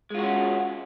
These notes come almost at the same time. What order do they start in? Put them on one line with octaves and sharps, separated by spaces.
G#3 F4 F#4 C#4